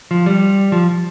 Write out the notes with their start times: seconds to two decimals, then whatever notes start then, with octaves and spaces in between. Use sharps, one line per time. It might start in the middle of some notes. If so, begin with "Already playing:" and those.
0.11 F3
0.26 G3
0.72 F3